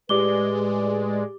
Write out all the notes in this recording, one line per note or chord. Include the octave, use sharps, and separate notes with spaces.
A2 G#3 G4 B4 D5 D6 G7